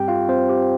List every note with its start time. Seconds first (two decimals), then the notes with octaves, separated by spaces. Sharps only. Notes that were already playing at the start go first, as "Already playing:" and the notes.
Already playing: G2 G3 C4 G4 G5
0.08 F4 F5
0.29 C4 C5
0.49 G4